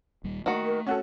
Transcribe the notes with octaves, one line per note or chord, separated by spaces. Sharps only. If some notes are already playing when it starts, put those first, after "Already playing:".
D#1 D#2 G3
D#3 A3 A#3 F#4
A#4
C#4 F#4 A4 F#5